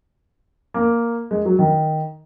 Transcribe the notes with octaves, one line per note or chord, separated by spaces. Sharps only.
A#3
G#3
F#3
D#3